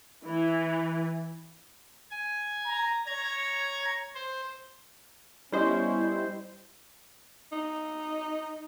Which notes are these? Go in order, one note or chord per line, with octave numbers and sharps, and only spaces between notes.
E3
G#5
A#5
C#5 A#5 G#6
C5
G3 B3 C#4 E4 C5 D#5
D#4